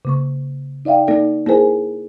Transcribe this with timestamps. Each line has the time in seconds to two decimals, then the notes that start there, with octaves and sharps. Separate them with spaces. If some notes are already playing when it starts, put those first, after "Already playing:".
0.05 C#3 A#3 C#6
0.85 D#4 D5 E5 F5 G5
1.07 A#3 D#4 A4 D5
1.46 A#3 E4 G#4 A#4 C5 G#5